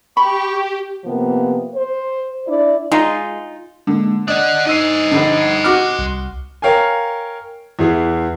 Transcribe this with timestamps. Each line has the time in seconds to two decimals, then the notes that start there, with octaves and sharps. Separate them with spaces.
0.17 G4 B5 C#6
1.04 C3 F3 A#3 B3
1.75 C5
2.47 D4 E4 D5
2.92 G#3 D#4 F4
3.87 D3 G#3 A#3
4.28 D4 D5 D#5 F#5 D#6
4.67 D#4 C5 D#5 E6 C7
5.11 A#1 D3
5.64 F#4 D6 F6
5.99 C2
6.62 A#4 C#5 F5 G5 G#5
7.79 E2 E3 G#4